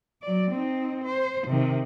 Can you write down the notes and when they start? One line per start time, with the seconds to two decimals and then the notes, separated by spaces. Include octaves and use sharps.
0.22 F#3 D5
0.51 C4 D#4
1.04 C5
1.47 C3 D#3